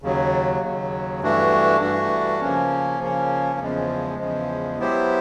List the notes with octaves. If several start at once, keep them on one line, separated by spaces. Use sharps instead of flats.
D#2 C#3 F#3
D#2 C#3 F#3
G2 E3 A3 D4 F#4
G2 E3 A3 D4 F#4
C#3 F3 A#3 C#4
C#3 F3 A#3 C#4
E2 C#3 F3 G#3
E2 C#3 F3 G#3
F#3 B3 E4 G4 C5